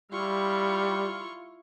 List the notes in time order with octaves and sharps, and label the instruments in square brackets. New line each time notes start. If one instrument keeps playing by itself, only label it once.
[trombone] G3 [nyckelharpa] E4 F5 [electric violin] F4 C#6